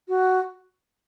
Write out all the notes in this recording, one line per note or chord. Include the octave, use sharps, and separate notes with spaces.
F#4